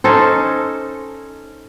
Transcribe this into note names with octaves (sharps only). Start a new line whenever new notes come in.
C#4 D#4 A4 C5